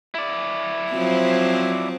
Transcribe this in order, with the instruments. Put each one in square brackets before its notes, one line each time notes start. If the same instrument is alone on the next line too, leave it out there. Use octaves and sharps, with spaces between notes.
[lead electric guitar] E4 D5
[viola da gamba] F3 F#3 C4